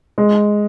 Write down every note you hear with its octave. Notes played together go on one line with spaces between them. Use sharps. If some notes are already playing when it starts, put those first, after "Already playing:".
G#3